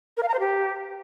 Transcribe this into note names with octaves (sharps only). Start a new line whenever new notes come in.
A#4
F5
A#5
C5
G4